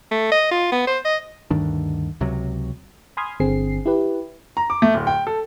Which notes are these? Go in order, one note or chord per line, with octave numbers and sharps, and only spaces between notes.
A3
D#5
F4
B3
C5
D#5
D2 G2 D#3 D4
C#2 C3 F#3
G#5 B5 C6 D#6 F6 G#6
G1 D3 C4 G#4 C7
E4 G4 B4
A#5
D6
A3
D1
G5
A4